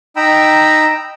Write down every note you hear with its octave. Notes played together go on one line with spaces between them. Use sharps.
D#4 G5 A#5 B5 E6